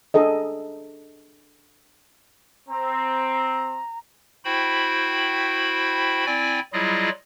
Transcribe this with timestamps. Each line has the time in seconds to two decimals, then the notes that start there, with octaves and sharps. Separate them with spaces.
0.14 D4 G#4 A4 D#5
2.69 C4 A#5
4.45 E4 F#4 C5 G5 B5
6.26 C4 E4 D5 G5 G#5
6.73 F#3 G3 E4 F4 G#4 D#5